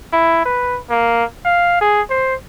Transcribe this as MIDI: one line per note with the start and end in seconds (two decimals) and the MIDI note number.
0.13 0.45 64
0.46 0.80 71
0.90 1.24 58
1.45 1.80 77
1.81 2.02 68
2.10 2.35 72